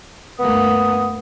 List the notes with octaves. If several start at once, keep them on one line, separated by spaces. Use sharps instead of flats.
D2 G2 A#3 B3 D#6